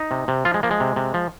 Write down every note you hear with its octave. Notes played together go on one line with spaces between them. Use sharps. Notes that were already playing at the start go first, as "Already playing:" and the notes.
Already playing: D#4
C3
C3
F3 F4
G#3
F3 A#3
G#3
C3
C3
F3